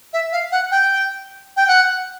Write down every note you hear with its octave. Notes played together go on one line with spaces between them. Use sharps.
E5
F5
F#5
G5
G5
F#5